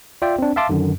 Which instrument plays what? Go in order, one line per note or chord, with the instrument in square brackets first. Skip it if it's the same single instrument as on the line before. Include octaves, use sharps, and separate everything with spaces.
[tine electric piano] F4 D5 E5 G5
C4 D4
E5 F5 A5 C6 D6
F#2 D3 D#3